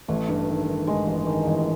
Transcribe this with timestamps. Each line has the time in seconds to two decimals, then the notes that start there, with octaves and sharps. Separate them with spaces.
0.08 A1 A3
0.29 G2
0.48 D#3
0.68 D#3
0.87 G2 G#3
1.07 A1
1.27 D#3
1.47 A1